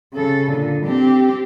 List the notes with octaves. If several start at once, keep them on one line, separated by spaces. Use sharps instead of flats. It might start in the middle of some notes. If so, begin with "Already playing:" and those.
C#3 A4
A#2 D3
C4 G4